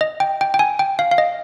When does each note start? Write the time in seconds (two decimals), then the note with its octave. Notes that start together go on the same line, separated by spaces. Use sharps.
0.01 D#5
0.20 G5
0.41 G5
0.54 G5
0.59 G#5
0.79 G5
0.99 F5
1.11 F5
1.18 D#5